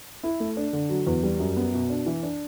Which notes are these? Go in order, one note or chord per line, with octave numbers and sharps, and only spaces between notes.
E4
A3
D4
D3
F#3
E2
G3
F#2
B3
B2
D4
E3
D4